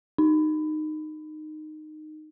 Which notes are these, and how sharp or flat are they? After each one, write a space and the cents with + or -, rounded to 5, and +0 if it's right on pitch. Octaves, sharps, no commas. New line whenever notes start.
D#4 -15